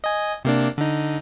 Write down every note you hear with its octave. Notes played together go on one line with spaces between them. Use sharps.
D#5 G#5
C3 A#3 D4
D3 D#4